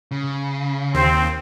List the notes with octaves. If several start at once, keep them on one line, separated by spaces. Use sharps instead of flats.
C#3
D#2 C4